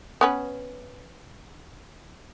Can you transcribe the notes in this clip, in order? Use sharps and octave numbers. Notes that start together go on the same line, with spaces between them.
B3 C#4 B4